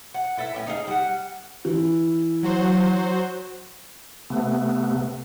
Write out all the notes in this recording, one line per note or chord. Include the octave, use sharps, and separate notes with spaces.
F#5
E4 A4 B4 E5
A2 C#4
D#4 G#4 D#5 F5
G3 F#5
E3
F#3 F#4 C5
C3 A3 B3